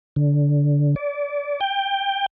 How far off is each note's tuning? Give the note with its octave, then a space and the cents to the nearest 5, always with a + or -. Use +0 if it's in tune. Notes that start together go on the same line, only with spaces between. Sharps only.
D3 -20
D5 -30
G5 +15